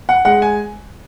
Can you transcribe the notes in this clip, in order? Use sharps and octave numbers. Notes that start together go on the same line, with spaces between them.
F#5
G#3 F#5
G#5